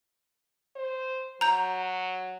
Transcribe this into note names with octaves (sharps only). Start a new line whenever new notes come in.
C5
F#3 A#5 G6